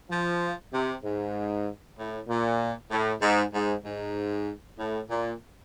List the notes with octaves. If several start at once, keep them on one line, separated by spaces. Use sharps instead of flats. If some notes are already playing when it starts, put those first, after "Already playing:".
F3
C3
G#2
A2
A#2
A2
G#2
G#2
G#2
A2
A#2